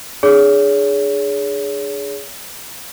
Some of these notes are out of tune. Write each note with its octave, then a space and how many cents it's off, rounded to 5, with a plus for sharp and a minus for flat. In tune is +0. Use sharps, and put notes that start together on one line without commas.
D4 +30 G#4 +0 C#5 +35